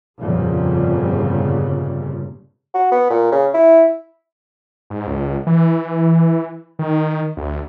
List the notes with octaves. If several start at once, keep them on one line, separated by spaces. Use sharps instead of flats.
G1 F2 A#2 C#3 G3
F#4
B3
A#2
C#3
E4
G#2
C#2
E3
D#3
D2